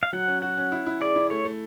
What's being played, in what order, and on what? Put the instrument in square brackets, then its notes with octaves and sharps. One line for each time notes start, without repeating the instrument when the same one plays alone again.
[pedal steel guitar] F5
[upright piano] F#3 [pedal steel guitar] F#5
[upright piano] C#4
[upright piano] F#4 [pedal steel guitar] F#5
[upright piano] C#4
E4
E4
[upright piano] G#4 [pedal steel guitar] D5
[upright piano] E4
[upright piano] A3 [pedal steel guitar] C#5
[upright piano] A3